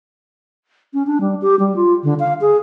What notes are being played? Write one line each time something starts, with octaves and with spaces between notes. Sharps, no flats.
C#4
D4
G3
G4
G3
F4
D3
F5
G#4